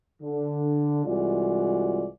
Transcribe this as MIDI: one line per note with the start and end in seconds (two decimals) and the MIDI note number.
0.22 1.05 50
1.06 2.06 36
1.06 2.06 52
1.06 2.06 56
1.06 2.06 65
1.06 2.06 66
1.06 2.06 74